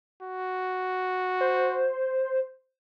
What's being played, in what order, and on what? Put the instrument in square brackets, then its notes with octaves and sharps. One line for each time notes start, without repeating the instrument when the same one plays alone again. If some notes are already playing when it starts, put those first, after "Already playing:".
[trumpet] F#4
[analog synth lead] C5